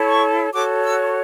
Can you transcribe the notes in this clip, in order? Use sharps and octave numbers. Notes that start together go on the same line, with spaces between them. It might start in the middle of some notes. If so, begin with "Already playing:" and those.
Already playing: E4 A4 C#5
C#6
F#4 A4 C#5 D6
E6